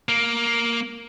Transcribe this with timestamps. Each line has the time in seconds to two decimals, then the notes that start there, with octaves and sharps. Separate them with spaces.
0.09 A#3